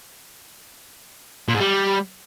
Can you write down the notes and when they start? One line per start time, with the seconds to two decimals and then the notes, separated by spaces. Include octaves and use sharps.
1.49 A#2
1.54 G#2
1.60 G3